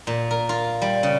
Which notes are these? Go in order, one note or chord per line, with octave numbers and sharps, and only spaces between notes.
A#2
A#4
F4
G3
C#3